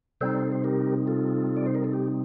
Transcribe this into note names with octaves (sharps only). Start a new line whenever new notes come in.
C3 G3 C4 D#4 A4 C5
C5
G4 A#4
F4 A4
D5
C5
A#4
A4
G4